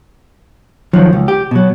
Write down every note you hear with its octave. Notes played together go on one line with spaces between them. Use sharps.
F2 D#3 F3 F#3
C#2
G4
B2 F#3